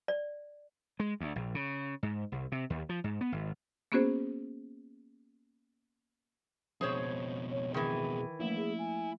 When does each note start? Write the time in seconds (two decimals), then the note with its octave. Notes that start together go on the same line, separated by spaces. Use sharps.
0.08 D5
1.00 G#3
1.20 D2
1.36 A#1
1.55 C#3
2.03 G#2
2.32 C2
2.52 C3
2.70 D#2
2.89 F3
3.04 G#2
3.21 B3
3.32 G#1
3.92 A#3 B3 C#4 F#4 G#4 C5
6.81 F2 B2 G#4 C5 C#5
7.51 C#5
7.74 D#3 E3 G#4
8.40 F3 A3 A#3 E4
8.57 G#4
8.79 G#5